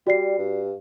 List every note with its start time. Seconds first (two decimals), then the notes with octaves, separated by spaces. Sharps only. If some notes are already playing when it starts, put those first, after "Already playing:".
0.07 G3 F#4 D5 C7
0.38 G2